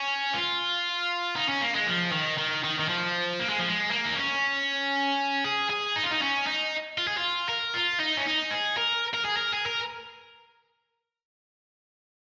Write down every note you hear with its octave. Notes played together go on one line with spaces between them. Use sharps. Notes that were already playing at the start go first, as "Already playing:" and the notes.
Already playing: C#4
F4
D#4
C#4
A#3
G#3
F3
D#3
D#3
D#3
D#3
F3
A#3
G#3
F3
G#3
A#3
D#4
C#4
G#4
G#4
D#4
F4
D#4
C#4
D#4
F4
G#4
F4
A#4
F4
D#4
C#4
D#4
G#4
A#4
A#4
G#4
A#4
G#4
A#4